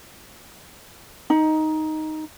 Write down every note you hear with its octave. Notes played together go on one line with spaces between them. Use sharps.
D#4